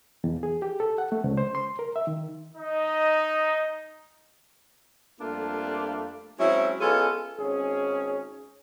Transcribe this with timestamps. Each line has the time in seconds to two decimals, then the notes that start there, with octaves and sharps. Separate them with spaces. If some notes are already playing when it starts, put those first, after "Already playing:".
0.24 E2
0.43 G#4
0.62 G4
0.80 A4
0.98 F#5
1.12 A3
1.24 C#2
1.38 C5
1.55 C6
1.79 A#4
1.96 E5
2.07 D#3
2.55 D#4 D#5
5.20 F2 G3 A3 A#3 D4 F4
6.39 F#3 G#3 C4 C#4 E4
6.80 G#3 B3 C#4 F4 G#4 A4
7.39 G#1 C#4 G#4